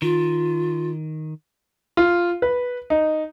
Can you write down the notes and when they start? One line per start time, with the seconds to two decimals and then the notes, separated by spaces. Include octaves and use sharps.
0.02 D#3 F4
1.97 F4
2.42 B4
2.90 D#4